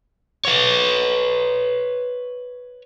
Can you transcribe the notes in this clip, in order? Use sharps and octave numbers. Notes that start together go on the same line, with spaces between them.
B4 C#5